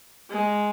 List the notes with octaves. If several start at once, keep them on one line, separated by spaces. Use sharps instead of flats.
G#3